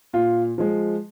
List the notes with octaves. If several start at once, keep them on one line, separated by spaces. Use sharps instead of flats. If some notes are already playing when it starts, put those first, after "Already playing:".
A#2 F4
F3 G#3